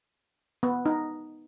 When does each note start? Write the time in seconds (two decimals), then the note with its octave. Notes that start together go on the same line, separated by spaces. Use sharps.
0.63 B3
0.86 D#4